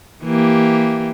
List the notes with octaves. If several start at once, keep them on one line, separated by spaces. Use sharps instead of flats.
E3 A#3 G4